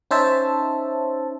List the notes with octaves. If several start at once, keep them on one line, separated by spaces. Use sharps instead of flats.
C#4 D#4 C5 C#5 E5 A5